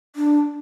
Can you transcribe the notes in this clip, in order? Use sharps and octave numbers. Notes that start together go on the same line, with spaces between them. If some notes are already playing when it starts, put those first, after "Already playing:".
D4